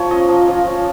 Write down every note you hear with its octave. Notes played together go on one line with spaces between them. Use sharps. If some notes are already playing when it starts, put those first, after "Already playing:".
Already playing: F3 A#3 C#5
C#4 D#5
F3
F3
C#4